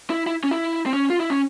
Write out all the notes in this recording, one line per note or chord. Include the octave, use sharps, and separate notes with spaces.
E4
E4
C#4
E4
C4
C#4
F4
E4
C#4